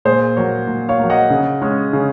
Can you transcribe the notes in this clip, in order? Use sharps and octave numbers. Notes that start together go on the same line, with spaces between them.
A#2 G#4 C5
F#3 A#3 A#4 C#5
A#2
C#5 F5
F#3 A#3
D#5 F#5
C#3
G#3 C#4
C#3